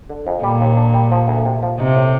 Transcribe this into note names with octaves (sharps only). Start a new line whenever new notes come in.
D3
F2
A#2 G3
D#2
D4
G3
F3
D2
C3
F3
C3 D#4
A2